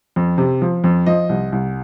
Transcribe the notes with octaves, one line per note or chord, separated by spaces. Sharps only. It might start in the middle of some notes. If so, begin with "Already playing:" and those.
F2
C3
F3
F2
F3 D#5
C2
C2